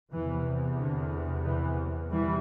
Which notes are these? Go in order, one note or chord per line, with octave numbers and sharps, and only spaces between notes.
E2 C3 E3
D3
E3
E3 G3